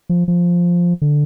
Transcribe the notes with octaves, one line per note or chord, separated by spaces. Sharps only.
F3
F3
D3